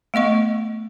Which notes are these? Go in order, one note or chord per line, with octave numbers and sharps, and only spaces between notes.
A3 B3 D#5 C#6